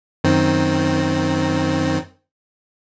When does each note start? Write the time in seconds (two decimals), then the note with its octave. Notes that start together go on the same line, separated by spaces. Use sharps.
0.24 F#2 D#3 C4